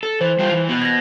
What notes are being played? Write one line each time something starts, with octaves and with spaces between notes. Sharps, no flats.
A4
E3 C5
G3 F4
E3
B3 F#4
G#6 A#6